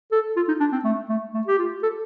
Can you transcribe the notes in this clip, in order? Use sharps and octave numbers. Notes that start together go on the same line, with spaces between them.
A4
F4
D#4
D4
C4
A3
A3
A3
G4
F4
A4